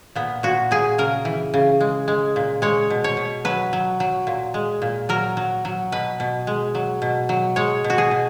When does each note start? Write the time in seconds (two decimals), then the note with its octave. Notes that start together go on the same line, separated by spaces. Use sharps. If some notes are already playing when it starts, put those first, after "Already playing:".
0.15 A#2 B3
0.43 A#2 F#4
0.71 A#2 G#4
0.98 C#3 A#4
1.25 E3
1.54 C#3
1.80 G#3
2.08 G#3
2.36 A#2
2.62 G#3 C#5
2.90 B2
3.04 C#5
3.17 B2
3.45 F#3 B4
3.73 F#3
4.00 F#3
4.27 A#2
4.54 G#3
4.82 A#2
5.09 F#3 A#4
5.37 F#3
5.65 F#3
5.92 B2 B4
6.20 B2
6.47 G#3
6.75 F#3
7.02 B2
7.29 F#3
7.56 G#3 C#5
7.84 B2
7.90 F#4
7.98 G#4
8.11 B2